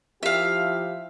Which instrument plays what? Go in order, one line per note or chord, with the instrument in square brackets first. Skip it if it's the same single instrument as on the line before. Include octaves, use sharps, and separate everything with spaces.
[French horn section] F3 E4 G4 [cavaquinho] E5 F5